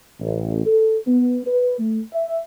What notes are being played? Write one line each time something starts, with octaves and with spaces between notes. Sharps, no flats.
A1
A4
B3
B4
A3
E5